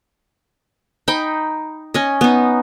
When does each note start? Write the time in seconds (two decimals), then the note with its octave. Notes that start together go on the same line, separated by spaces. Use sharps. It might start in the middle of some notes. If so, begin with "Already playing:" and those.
1.08 D#4 G5 B5
1.94 C#4 D#5
2.21 B3 D#4